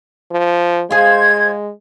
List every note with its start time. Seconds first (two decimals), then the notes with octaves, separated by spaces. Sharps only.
0.32 F3
0.91 G#3 F4 G#4 C5 G#6